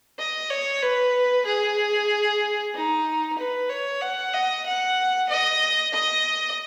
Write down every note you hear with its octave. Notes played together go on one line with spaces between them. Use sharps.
D#5
C#5
B4
G#4
D#4
B4
C#5
F#5
D#5
F#5
D#5
D#5